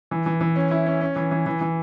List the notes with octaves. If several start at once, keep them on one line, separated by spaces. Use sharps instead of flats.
E3
E3
E3
C#4
E4
C#4
C#4
E3
E3
E3
E3